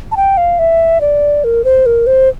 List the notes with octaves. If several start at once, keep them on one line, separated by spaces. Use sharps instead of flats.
A5
G5
F5
E5
D5
A#4
C5
A#4
C5